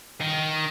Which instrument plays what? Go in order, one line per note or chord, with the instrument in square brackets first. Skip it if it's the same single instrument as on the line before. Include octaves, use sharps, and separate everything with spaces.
[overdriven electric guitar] D#3